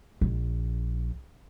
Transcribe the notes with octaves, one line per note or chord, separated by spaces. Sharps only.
A#1